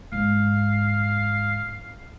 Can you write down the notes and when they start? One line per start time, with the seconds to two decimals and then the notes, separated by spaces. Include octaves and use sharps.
0.12 G#2 F5